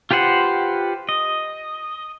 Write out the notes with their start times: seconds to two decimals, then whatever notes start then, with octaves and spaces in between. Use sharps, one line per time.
0.11 F4 G4 B4 C5 F#5
1.09 D#5